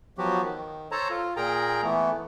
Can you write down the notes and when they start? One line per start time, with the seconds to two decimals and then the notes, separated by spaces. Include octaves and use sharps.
0.18 F3 F#3 B3 F#4 G4
0.42 D#3
0.91 A4 C5 C#5 A5 A#5
1.10 F4
1.37 A#2 G#4 A#4 G5 A#5
1.83 E3 A3 B3